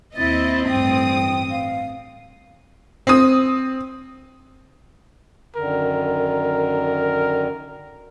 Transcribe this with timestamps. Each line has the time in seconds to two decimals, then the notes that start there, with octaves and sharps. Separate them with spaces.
0.17 D#2 C4 E4 D#5 A6
0.68 A1 G2 G5 D#6
1.50 F5
3.07 C4 D#6
5.56 F#2 D3 D#3 A#4